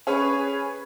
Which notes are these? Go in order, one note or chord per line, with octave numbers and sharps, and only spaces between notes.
C#4 G#4 B4 C#5